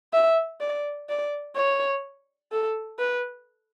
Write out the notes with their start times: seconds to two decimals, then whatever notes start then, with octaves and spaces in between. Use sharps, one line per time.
0.13 E5
0.61 D5
1.09 D5
1.56 C#5
2.52 A4
2.99 B4